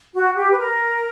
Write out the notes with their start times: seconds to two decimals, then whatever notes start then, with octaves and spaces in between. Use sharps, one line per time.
0.14 F#4
0.36 G4
0.52 B4
0.58 A#4